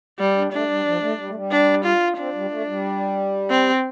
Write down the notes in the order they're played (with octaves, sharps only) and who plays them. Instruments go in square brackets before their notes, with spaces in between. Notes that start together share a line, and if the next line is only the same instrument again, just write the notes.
[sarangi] G3
[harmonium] D4
[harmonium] A3 [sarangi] D4
[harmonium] G3
F3
A3
G3
A3
G3
[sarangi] D4
F4
[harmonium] C4 [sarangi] D4
[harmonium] G3
A3
G3
[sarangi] C4